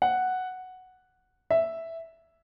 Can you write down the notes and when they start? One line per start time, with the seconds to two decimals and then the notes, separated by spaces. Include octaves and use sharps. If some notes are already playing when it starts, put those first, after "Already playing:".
0.02 F#5
1.51 E5